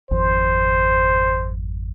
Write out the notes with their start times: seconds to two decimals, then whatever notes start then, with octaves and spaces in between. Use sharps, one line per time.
0.11 G#1 F2 C5